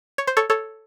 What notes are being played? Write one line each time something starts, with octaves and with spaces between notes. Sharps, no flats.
C#5
C5
A4 C#5
A4 C#5